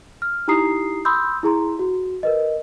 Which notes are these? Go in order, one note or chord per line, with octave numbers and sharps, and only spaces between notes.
F6
D#4 E4 G4 A#5 D#6 C7
B5 C6 D#6 E6 G6
E4 G#4 A#5 C6
F#4
A#4 B4 D#5